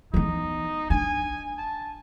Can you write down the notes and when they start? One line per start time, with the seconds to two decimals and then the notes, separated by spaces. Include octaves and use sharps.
0.14 E3 B3 D#4
0.90 D4 G#5
1.58 A5